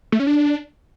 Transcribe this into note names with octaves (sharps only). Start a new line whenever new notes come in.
A3
C#4
D4